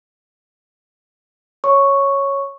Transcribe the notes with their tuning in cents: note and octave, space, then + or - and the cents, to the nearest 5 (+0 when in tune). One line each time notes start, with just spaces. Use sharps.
C#5 -5 C#6 +0